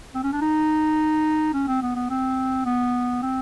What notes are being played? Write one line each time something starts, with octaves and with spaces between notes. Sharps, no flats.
C4
C#4
D4
D#4
C#4
C4
B3
B3
C4
B3
C4